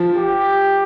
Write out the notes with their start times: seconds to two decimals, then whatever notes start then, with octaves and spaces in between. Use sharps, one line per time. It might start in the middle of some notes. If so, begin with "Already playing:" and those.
Already playing: F3
0.16 G4